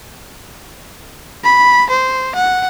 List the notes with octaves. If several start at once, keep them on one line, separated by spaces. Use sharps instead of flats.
B5
C5
F#5